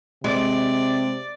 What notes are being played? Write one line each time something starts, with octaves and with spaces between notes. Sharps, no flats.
C3 G#3 D5